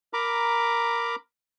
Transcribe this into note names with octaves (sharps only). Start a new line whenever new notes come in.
A#4 A#5 B5 D6